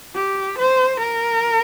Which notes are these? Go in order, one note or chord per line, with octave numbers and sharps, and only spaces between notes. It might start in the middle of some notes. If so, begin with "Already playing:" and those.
G4
C5
A#4